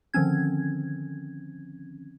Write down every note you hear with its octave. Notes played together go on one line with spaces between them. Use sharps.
D3 D#3 F3 C4 C#4 G#6